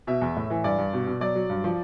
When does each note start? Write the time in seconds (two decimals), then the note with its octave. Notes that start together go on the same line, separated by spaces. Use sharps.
0.07 B2 E5
0.21 E2
0.36 A2
0.50 E3
0.64 G2 D5
0.78 G2
0.93 B2
1.07 B2
1.21 F#3 D5
1.35 F#3
1.50 G2
1.64 F3